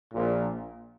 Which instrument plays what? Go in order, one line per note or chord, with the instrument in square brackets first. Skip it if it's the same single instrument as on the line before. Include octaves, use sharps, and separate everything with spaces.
[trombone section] A#1 A#2